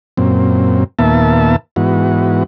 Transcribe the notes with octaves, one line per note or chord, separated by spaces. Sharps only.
F#2 A#2 C4
D#2 A#2 A#3 B3 E5 A5
G#2 E3 B3 F#4